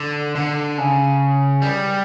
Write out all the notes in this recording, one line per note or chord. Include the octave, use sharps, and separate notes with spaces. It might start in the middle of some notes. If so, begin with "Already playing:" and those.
Already playing: D3
D3
C#3
G3